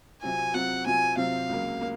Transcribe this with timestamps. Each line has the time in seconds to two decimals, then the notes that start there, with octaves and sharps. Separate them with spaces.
0.22 C3 F#3 C4 F4 G#5
0.54 C3 F#3 C4 F4 F#5
0.86 C3 F#3 C4 F4 G#5
1.17 C3 F#3 C4 F4 F5
1.49 C#2 C#3 F#3 A#3
1.81 A#3